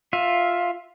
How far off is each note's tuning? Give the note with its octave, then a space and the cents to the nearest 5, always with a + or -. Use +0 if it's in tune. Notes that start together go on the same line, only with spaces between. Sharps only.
F4 +10 E5 +0